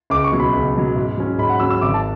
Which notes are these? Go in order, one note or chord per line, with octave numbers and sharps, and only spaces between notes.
C#2 D6
C#6
B2 F#3
B5
C#2
B2 F#3
G#2
F#3 C#4
G#2 B5
F#5
F#3 C#4 E6
E6
G#1 D6
A5